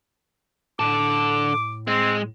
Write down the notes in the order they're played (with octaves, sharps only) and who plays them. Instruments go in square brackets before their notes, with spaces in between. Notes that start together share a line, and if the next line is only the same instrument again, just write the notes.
[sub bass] A2 [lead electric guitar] D3 A4 [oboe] D6
[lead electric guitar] G#3 [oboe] C4